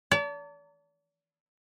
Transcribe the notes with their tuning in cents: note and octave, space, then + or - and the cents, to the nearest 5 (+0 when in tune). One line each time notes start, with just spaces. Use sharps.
D5 -40 A5 +40